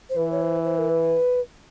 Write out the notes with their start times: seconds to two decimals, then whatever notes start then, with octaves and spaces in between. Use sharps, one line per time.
0.10 C5
0.16 E3 B4
0.31 C#5
0.42 C5
0.65 C5
0.78 A#4
0.89 B4